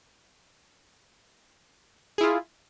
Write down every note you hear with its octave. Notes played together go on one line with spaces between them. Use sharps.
E4 F4 G#4